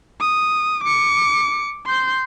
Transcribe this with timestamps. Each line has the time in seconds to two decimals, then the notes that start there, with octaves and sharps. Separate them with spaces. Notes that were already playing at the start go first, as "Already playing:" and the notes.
0.20 D#6
0.84 D6 C#7
1.86 C6 G6